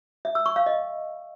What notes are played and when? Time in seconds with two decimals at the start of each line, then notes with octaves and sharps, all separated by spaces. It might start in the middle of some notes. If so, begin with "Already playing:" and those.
0.25 E5
0.35 E6
0.46 C#6
0.56 F5
0.66 D#5